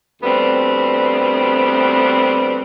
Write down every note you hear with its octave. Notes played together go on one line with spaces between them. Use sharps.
D2 G3 B3 C4